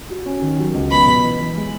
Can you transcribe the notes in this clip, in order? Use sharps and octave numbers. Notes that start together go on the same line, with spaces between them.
F#4
C#4
D#3
F#3
C#2
B3 B5
B2
E3
E3
G#3